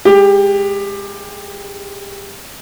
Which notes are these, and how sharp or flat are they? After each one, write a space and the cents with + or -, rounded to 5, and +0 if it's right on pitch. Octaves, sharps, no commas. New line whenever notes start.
G#3 +0 G4 +20